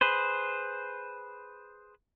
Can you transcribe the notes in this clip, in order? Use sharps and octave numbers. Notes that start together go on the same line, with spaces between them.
G#4 B4 C5